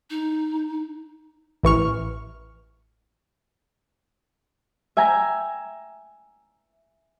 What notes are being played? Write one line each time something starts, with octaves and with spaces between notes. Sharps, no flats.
D#4
A1 E3 C#6 F6
E5 G5 G#5 A#5